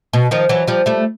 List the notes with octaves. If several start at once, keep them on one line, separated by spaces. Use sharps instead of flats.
B2
D#3 F3
E3 F#3
F3 G3
G3 A3